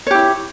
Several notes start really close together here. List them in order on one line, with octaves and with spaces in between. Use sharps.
C#5 G4 E4